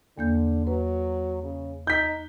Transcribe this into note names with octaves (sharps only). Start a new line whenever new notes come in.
E2 D3 A#3 G6
F#3 B4
C#3
D#4 G6 B6